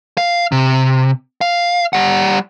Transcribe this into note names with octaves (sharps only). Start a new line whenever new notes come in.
F5
C3
F5
G3 F#5